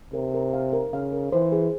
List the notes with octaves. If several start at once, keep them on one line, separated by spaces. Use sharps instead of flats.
C3 A#4
A#4
F5
A#4
C#3 F5
A#4
E3 C5
G#4